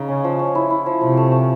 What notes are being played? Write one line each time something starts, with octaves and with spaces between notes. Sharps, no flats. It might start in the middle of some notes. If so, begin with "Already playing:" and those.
Already playing: C#3 D#4
C#4
F3
C#4
E4
E4
F3
C3 F3
A3
A3